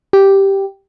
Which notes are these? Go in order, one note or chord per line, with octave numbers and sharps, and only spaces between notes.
G4